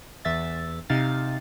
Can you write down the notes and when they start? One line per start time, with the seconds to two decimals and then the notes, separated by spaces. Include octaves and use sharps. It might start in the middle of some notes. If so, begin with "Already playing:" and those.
0.25 E2 E5 A6
0.90 C3 D#4 F5 A6